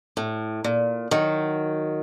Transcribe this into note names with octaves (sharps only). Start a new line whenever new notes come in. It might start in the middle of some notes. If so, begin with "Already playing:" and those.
A2
A#2
D#3 F#3